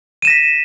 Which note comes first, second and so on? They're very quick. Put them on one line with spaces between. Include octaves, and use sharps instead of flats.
D#7 E7 A#6 B6